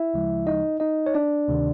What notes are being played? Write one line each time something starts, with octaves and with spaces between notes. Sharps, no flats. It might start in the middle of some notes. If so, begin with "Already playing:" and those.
Already playing: E4 E5
D2 C#3 F3 G#3
D#4 D#5
D#4 D#5
C#5
D4 D5
D2 C3 D#3